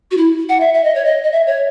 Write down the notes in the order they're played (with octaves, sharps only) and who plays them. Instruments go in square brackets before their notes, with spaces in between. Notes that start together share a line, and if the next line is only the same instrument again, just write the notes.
[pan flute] F#4
E4
F#5
E5
E5
D#5
C#5
D#5
D#5
E5
C#5